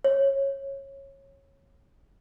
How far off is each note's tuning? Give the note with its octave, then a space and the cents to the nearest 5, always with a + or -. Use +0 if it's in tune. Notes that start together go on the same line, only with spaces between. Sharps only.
C#5 -15